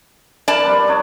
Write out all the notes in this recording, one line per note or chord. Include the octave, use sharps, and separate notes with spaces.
A#4 B4 D5 A5
G3 C4 D4
D4 D#4 C#5